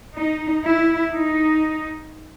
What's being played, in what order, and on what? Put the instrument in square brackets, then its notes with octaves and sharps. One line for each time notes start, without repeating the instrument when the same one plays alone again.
[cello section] D#4
E4
D#4